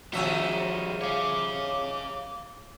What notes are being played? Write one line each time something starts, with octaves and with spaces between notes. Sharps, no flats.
D#3 F3 G3 G#3 C#4 F#4 G#4 E5
C#5 F5 D6